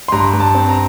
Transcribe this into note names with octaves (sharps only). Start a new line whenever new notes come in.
C6
G2 A#5
G2
A5
C4
A#5